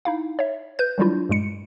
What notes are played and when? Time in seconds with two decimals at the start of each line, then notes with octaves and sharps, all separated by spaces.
0.05 D#4 E4 F5
0.39 C#5 E5
0.79 B4 G6
0.98 D#3 F#3 G3 D4 E4 F4
1.29 G2 A#2 G#3 C#7